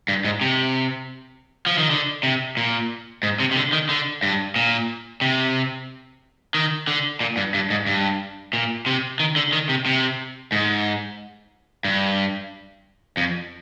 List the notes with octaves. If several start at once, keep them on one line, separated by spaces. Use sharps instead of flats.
G2
G#2
C3
F3
D#3
D3
C3
A#2
G#2
C3
C3
D3
D#3
D3
G2
A#2
C3
D#3
D3
A#2
G2
G2
G#2
G2
A#2
C3
D#3
D3
D#3
C3
C3
G#2
G2
F2